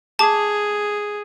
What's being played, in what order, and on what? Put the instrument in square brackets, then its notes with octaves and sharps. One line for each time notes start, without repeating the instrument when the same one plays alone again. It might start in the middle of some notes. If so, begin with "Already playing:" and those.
[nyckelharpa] G#4 [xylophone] A5 D6